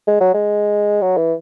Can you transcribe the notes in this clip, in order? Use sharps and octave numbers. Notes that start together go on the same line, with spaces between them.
G#3
F#3
G#3
F#3
E3